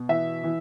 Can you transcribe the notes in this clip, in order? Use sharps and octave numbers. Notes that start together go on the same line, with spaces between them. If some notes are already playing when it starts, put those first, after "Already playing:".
Already playing: B2
E3 E5
E3